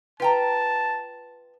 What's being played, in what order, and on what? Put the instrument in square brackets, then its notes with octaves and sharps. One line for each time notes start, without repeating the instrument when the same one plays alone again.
[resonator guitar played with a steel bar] F4 G5 A#5 [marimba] B4 [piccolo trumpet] A5